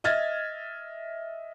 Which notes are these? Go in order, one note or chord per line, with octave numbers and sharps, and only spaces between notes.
D#5 E5 F6 G#6 A6